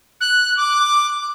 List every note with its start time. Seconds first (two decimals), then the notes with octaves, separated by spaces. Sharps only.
0.21 F#6
0.57 D6